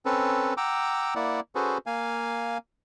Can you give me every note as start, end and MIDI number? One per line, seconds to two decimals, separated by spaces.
0.06 0.54 60
0.06 0.54 61
0.06 0.54 69
0.06 0.54 71
0.57 1.14 78
0.57 1.14 79
0.57 1.14 82
0.57 1.14 86
0.57 1.14 88
1.15 1.40 58
1.15 1.40 64
1.15 1.40 74
1.15 1.40 78
1.55 1.78 61
1.55 1.78 66
1.55 1.78 68
1.55 1.78 69
1.55 1.78 71
1.55 1.78 72
1.86 2.58 58
1.86 2.58 77
1.86 2.58 80